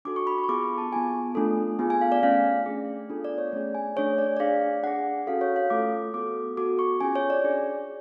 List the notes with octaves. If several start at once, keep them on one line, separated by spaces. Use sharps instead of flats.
D4 F#4 A4 D6
C#6
B5
B5
C#6
B3 F4 G#4 D6
C#6
A5
B3 F4 G#4 G#5
A3 D4 F4 A4
B3 F4 G#4 G#5
G#5
F5
D5
A3 C#4 G#4 F5
A3 D4 G#4
B3 D4 F4 A4
D5
C#5
A3 C#4 G#4 D5
G#5
A3 D4 G#4 C#5
D5
D5
D4 G#4 F5
D4 G#4 F#5
C#4 F#4 A4 F5
C#5
F5
A3 F4 A4 D6
B3 F#4 A4 D6
B3 F#4 A4 D6
C#6
C#4 F4 G#4 G#5
C#5
D5
D4 G#4